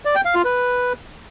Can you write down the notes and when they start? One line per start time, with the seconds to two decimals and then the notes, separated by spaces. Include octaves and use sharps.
0.05 D5
0.15 G5
0.25 F5
0.35 F4
0.45 B4